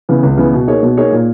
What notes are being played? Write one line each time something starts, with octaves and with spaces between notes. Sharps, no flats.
C#3 E3 B3
C#2
C#3 E3 B3
B2
A#3 D#4 G#4 C#5
B2
A#3 D#4 G#4 C#5
A#2